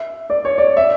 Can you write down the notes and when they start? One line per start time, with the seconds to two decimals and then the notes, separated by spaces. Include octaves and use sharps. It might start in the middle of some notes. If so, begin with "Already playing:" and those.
Already playing: E5
0.30 D5
0.45 C#5
0.58 D5
0.77 E5